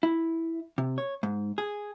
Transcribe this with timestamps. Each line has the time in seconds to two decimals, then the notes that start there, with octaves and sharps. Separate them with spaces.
0.03 E4
0.78 C3
0.98 C#5
1.23 G#2
1.58 G#4